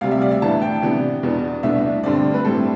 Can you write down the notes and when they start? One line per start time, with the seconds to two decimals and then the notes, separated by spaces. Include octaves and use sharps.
0.01 D2 C3 G3 F5
0.11 E5
0.22 D5
0.31 E5
0.42 A2 E3 B3 D4 A5
0.62 G5
0.82 C3 E3 B3 D4
1.23 E2 B2 B3 D4
1.63 C2 B2 A3 D4 E5
2.03 G2 D3 A3 C4 D5
2.34 B4
2.44 A2 G3 C4 A4